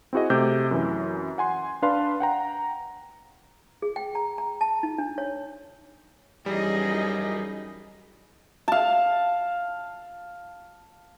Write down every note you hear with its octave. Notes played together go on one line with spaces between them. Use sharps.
C4 E4 F#4 G#4 D#5
C3 A3 D6 G6
F#2 E3
F#5 G#5 C6
D4 B4 F5 A5 C6
F#5 G5 A#5
G#4
G5
A#5
A#5
A5
D#4
D4
C#5
F#2 E3 G3 D#4 G#4 D#5
F5 A5